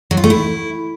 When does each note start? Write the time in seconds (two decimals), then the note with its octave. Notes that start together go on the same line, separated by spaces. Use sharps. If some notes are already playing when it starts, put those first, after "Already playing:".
0.11 F#3
0.17 F4
0.24 A3
0.30 E4